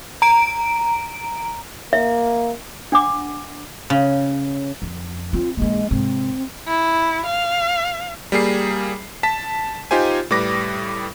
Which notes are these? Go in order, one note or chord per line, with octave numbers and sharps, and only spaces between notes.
A#5 D7
A#3 E5
D4 F#5 D6
C#3
F2
C4 F4
A#1 E3 G#3
G#2 C3 C4
E4
F5
G3 A#3 G#4 C7
A5 B6
D#4 F4 G4 C5 G#5
A2 G3 B4 D6 A#6